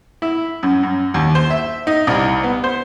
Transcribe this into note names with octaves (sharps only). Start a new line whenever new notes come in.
E4
F#2
F#2
D#2
C5
E5
D#4
C2
B3
C5